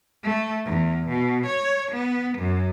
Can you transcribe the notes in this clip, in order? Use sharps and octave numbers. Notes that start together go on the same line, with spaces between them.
A3
E2
B2
C#5
B3
F#2